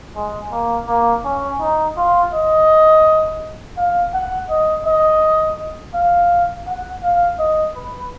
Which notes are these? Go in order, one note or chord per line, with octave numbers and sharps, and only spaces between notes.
G#3
A#3
A#3
C#4
D#4
F4
D#5
F5
F#5
D#5
D#5
F5
F#5
F5
D#5
B4